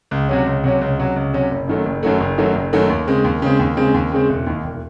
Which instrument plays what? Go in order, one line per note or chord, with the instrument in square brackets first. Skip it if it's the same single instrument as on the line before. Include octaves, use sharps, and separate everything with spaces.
[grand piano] C#2
C3 F#3 C#4
C#2
C3 F#3 C#4
C#2
C3 F#3 C#4
C#2
C3 F#3 C#4
F#1
F#2 D#3 F#3 A3
F#1
F#2 D#3 F#3 A3
F#1
F#2 D#3 F#3 A3
F#1
F#2 D#3 F#3 A3
D#2
C#3 G#3 C4
D#2
C#3 G#3 C4
D#2
C#3 G#3 C4
D#2
C#3 G#3 C4
E1
D#2 D#3
E1